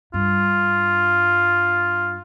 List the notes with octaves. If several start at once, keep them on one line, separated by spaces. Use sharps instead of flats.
G2 F4